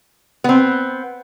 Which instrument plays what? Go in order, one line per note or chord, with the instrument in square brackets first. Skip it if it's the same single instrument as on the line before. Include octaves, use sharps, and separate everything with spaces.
[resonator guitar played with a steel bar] B3 C4